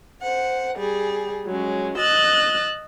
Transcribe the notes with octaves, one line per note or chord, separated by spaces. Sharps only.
C5 F#5
G3 G#4
F#3 G#3 C#4
D#5 E6 F#6 A6